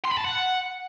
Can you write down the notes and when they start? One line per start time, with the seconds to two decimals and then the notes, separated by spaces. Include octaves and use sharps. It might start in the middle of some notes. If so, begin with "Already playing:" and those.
0.04 C6
0.11 B5
0.18 A5
0.24 F#5